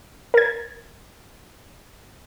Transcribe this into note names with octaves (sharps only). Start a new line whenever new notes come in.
A#4 G#6